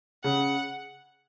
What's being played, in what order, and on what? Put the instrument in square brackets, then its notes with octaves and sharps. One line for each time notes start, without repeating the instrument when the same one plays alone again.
[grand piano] C#3 [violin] F#5